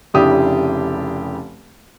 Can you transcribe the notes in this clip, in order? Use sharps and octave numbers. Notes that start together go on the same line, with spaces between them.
F1 C#3 D4 E4 G4 D#6